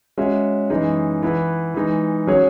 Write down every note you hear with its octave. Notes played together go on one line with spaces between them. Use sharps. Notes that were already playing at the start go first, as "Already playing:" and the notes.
G#3 C#4 F#4 C#5 E5
F#2 E3 G#3 D#4 G#4
E3 B3 E4 B4
E3 G#3 D#4
F#3 C#4 G#4 C#5